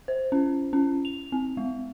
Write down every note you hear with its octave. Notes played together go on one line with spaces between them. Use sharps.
C5
C#4
C#4
F7
C4
G#3